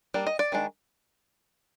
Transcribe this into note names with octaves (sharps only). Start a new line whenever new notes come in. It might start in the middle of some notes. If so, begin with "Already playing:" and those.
G3 A#3 D4
D#5
D5
D#3 G#3 D4